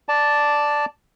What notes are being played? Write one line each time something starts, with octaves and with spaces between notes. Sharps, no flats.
D5 A5